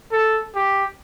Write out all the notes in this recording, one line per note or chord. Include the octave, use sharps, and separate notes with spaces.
A4
G4